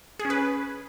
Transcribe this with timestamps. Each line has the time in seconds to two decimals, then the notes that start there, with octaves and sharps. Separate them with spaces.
0.19 G#4
0.25 C#4
0.30 B4